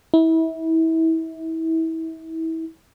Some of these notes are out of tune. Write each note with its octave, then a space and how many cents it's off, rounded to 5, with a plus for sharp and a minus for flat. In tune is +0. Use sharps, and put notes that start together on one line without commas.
E4 -30